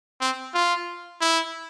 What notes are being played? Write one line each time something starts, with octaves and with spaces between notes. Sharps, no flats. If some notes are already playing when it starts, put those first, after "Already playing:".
C4
F4
E4